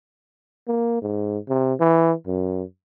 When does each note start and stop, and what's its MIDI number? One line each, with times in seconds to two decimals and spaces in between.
0.68 1.00 58
1.02 1.38 44
1.49 1.74 48
1.80 2.13 52
2.26 2.63 42